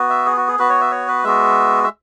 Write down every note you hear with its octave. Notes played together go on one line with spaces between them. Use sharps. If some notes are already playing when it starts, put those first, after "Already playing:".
Already playing: B3 F#4
E5
G#4
F#4
G#4
B3 F#4 B4
C#5
E5
C#5
B4
G#3 B3 F#4 E5
E5